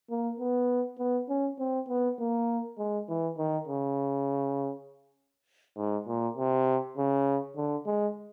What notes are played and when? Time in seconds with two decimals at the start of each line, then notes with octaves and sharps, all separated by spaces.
0.10 A#3
0.40 B3
0.99 B3
1.29 C#4
1.59 C4
1.89 B3
2.19 A#3
2.78 G#3
3.09 E3
3.38 D#3
3.68 C#3
5.77 G#2
6.07 A#2
6.37 C3
6.97 C#3
7.57 D3
7.86 G#3